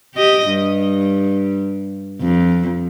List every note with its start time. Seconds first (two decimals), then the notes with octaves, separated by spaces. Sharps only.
0.15 G4 D#5
0.49 G2
2.22 F2